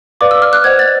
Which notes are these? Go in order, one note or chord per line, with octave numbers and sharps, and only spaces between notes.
B4 D5 F5 D6
E6
F6
F#6
C5 D#5 F#5 G#6
A6